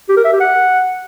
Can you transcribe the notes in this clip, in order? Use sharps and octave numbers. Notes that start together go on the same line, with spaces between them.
G4
A#4
E5
G4
F#5